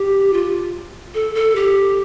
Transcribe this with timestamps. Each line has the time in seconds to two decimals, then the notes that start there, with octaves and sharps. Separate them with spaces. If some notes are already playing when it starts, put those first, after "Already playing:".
Already playing: G4
0.33 F4
1.15 A4
1.35 A4
1.56 G4